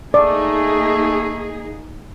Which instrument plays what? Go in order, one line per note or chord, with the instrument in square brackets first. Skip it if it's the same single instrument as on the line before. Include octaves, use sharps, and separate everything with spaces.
[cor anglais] A3 [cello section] A#3 D#4 G#4 [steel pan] D5